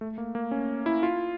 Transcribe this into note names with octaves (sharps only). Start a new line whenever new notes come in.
A3
A#3
A#3
C#4
E4
F4